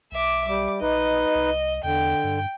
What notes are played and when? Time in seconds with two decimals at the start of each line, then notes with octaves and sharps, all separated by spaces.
0.12 B1 E5 D6
0.47 G3 D6
0.82 A#1 D#4 B4 D#5
1.35 C2
1.84 E2 D3 G5
2.24 G2